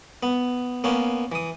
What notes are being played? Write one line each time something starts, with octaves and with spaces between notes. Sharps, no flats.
B3
A#3 B3 C#4
E3 D#6